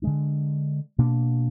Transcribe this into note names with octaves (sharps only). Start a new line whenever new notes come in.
D3 G#3 D4
B2 A#3 D4